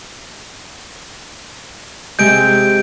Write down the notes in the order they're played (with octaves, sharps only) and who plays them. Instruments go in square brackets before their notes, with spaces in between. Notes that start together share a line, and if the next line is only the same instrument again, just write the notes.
[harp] C3 G#3 [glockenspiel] G6 D7